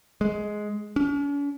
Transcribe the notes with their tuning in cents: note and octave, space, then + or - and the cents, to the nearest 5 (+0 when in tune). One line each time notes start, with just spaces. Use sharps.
G#3 +10
C#4 +45